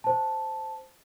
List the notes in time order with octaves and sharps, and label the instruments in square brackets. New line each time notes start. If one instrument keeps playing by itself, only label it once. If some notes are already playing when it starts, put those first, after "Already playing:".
[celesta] C5 A5